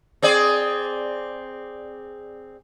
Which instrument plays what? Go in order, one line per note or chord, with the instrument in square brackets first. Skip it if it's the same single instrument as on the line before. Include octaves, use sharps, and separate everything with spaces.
[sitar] C4 G#4 D5